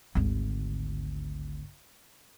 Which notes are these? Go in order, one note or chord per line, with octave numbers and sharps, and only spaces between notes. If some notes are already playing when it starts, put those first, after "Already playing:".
G#1 D2